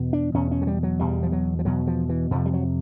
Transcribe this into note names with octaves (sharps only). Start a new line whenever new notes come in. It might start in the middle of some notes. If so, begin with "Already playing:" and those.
Already playing: E2 B2
D4
E2 B2 C#4
C#4
F#3
G3
F#3
E2 B2 G3
F3
F#3
F3
E2 B2 F#3
F3
E3
F2 C3 F3
G3
F#3